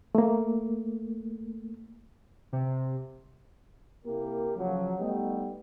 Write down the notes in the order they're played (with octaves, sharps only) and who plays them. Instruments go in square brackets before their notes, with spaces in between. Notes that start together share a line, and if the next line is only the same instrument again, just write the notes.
[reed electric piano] A3 A#3
[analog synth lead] C3
[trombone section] C3 A#3 E4 G4 A#4
C#3 F3 F#3
G3 A3 B3 D#4 G4